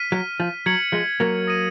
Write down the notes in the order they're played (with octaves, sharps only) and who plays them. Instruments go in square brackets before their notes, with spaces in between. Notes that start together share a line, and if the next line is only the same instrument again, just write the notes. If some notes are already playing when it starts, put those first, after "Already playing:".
Already playing: [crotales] F6 B6 D#7
[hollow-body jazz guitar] F#3
F3
[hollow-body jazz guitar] F#3 [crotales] G#6 C#7 F#7
[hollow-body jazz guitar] F3 G#3
F#3 A#3
[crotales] D#6 A#6 D#7